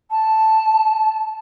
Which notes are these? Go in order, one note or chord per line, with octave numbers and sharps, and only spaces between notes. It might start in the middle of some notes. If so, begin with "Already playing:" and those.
A5